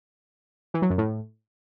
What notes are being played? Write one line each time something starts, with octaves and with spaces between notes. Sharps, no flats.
E3
F#3
F#2
A2